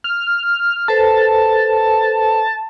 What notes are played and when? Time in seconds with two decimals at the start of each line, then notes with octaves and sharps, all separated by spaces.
0.04 F6
0.88 A4 B4 C5 A5